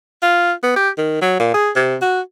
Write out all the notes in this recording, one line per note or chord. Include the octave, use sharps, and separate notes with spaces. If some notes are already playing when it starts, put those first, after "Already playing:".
F4
B3
G4
D#3
F#3
A#2
G#4
C3
F#4